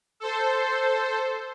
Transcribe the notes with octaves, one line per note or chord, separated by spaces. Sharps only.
A4 C5